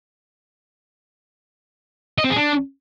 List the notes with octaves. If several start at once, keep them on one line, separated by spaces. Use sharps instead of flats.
D#5
C4
G#4
D4